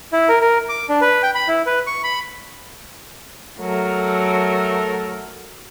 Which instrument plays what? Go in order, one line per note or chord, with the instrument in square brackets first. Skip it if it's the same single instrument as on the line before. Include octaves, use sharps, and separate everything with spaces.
[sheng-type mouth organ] E4
A#4
A#4
D6
D4
B4
G5
B5
E4
B4
C#6
B5
[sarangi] F#3 [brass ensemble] A3 A4 A#4